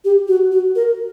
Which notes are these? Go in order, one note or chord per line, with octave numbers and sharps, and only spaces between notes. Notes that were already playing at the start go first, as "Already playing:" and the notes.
G4
F#4
F#4
A#4